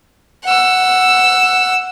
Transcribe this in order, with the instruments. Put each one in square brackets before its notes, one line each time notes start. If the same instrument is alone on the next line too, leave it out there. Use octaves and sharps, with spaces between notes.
[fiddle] F#5 E6